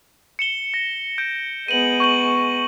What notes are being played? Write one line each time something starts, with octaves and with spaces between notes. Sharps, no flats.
C#7 E7 G7
A#6
G6 D7
G#3 B3 D#7 F#7
C#6 G6 F#7